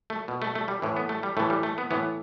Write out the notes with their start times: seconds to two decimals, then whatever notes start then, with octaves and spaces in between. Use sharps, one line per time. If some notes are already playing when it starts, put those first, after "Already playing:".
0.10 A3
0.28 B2
0.42 A3
0.55 A3
0.68 G3
0.82 A2 E3
0.97 B3
1.09 A3
1.23 G3
1.37 A2 A3
1.40 E3
1.50 G3
1.63 A3
1.78 B3
1.91 A2 E3 B3